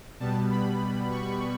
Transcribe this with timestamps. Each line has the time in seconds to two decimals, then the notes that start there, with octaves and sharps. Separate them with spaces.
0.20 B2 G3 B3 A5
0.50 B5
1.11 C#6